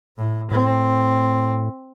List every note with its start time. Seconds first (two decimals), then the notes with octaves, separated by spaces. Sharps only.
0.18 A2
0.51 A2 C4